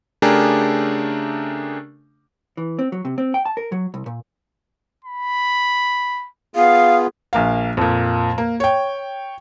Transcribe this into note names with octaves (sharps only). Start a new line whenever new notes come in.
C#3 A3 D4 G4 G#4 A#4
E3
C4
F#3
C3
C4
G5
A5
A#4
F#3
C2
A#2
B5
B3 F4 G#4 F5
A#1 A#3 F5
F2 A#2
A#3
C#5 G5